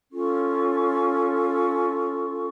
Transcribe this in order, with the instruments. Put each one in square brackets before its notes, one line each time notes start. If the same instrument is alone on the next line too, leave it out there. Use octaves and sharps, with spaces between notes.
[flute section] C#4 F4 A4 C#6